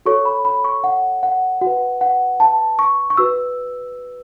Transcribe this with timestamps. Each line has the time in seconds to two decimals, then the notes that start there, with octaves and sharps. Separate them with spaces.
0.06 F#4 A4 C#5 C#6
0.25 B5
0.45 B5
0.64 C#6
0.84 F#5
1.23 F#5
1.61 F#4 F#5
1.67 B4
2.01 F#5
2.40 A5
2.79 C#6
3.10 C#6
3.17 F#4 B4 E6